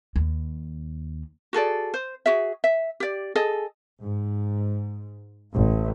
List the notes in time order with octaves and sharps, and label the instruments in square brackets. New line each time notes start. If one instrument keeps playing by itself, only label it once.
[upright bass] D#2
[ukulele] F#4 G#4 A4 D5
C5
F#4 G#4 E5
E5
G4 D5
G#4 A4 D#5
[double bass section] G#2
A1